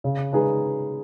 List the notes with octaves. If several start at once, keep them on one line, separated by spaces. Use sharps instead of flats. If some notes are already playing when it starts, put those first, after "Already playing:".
C#3
G#3 D#4 G#4 B4